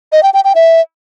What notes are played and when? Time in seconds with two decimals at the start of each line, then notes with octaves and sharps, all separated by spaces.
0.12 D#5
0.23 G5
0.34 G5
0.45 G5
0.55 E5